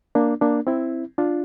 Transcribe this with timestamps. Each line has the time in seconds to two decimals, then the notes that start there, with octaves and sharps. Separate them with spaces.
0.15 A#3 D4
0.41 A#3 D4
0.67 C4 E4
1.18 D4 F4